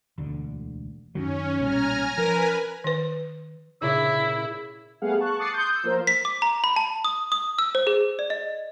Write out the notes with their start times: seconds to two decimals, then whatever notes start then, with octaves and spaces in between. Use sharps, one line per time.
0.18 E1 D2 D3
1.15 F#2 D#3 F#3 C#4
1.60 B1 A#2 G3 G#5 A#5 F6
2.18 F3 A#4 B4 G#5
2.84 D#3 B4
3.81 A#2 C#3 E4 E6
5.02 G3 A3 B3 G#4 F5 F#5
5.20 A5 C#6 F#6
5.39 D6 D#6 F#6 A6 C7 C#7
5.54 C6 D#6 G6
5.71 E6 G6
5.83 F3 A#3 F4 A#4 C5
6.07 B6
6.25 D6
6.42 A#5
6.64 B5
6.76 A5
7.05 D#6
7.32 D#6
7.59 E6
7.75 C5
7.87 G#4
8.19 D5
8.30 D#5